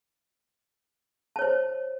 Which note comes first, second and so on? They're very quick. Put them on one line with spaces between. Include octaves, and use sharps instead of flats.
A5 C#5 C5